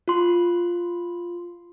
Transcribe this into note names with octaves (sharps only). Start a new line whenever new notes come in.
F4 C6